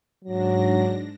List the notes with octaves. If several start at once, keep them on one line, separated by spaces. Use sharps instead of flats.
G#2 F#3 D4 A#6